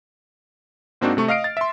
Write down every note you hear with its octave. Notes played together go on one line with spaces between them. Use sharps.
G#2 A#3 C4 D4 D#4 F#4
C3 A3 C#6
D#5 F5 F6 C7 D7
A6
E5 C6